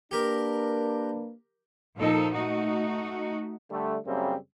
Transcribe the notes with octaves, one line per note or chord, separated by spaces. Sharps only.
A#3 D4 G4 A#4 B4
A#2 F3 D#4 A4
A3 D#4 F#4
D3 G3 A3
F#2 C#3 G3 A#3 C4